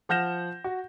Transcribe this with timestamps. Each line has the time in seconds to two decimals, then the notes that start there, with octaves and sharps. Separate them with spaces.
0.09 F3 F#5 F6 G6 A#6 E7
0.64 F#4